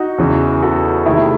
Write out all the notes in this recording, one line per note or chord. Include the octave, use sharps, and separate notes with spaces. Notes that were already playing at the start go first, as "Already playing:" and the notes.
Already playing: D#4 F#4
E2 C#3 E3
G#4
F#4 A4
C3 D#3 A3 E4 G#4